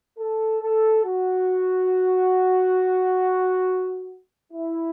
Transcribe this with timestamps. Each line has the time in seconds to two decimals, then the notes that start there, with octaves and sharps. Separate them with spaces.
0.18 A4
0.62 A4
1.05 F#4
4.53 E4